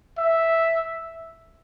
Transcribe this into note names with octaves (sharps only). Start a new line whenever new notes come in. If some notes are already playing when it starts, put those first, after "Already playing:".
E5